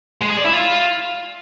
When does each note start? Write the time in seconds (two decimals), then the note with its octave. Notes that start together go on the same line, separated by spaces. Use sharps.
0.22 G#3
0.30 G#4
0.38 D5
0.45 E4
0.53 F4